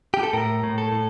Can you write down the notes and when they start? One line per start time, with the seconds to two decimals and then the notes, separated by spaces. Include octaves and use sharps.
0.14 G4
0.23 A4
0.33 A2 A#4
0.63 A2
0.78 A4
0.92 A2